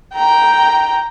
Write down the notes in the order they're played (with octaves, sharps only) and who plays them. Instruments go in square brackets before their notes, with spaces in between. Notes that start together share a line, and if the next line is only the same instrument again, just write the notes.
[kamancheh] G5 A#5